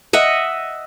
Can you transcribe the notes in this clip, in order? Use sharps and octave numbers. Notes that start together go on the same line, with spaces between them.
D#5 E5 F#5